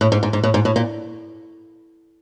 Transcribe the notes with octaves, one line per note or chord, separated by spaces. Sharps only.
A2
G#2
G#2
G#2
A2
G#2
A2
A#2